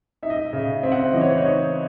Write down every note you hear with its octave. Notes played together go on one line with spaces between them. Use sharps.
D#4 E5
D#5
E5
C#3 E5
C4 E5
F#5
E5
E3 D#5
C#5
C5
C#5
D#4